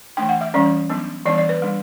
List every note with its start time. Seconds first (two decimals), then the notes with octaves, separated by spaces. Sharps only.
0.17 E3 A3 D4 G5
0.29 F#5
0.41 E5
0.54 E3 G3 C#4 D5
0.90 F#3 B3 D4
1.25 E3 G3 B3 D4 D5
1.38 D5
1.49 B4
1.62 G3 D4